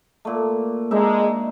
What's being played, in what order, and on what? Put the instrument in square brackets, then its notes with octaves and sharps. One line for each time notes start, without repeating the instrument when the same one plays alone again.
[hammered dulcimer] A#2 A3
[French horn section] G#3 [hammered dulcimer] D4 D#4 E5